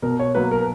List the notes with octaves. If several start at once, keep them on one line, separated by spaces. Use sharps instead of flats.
B2 A#4
C#5
F#3 A#3 B4
A#4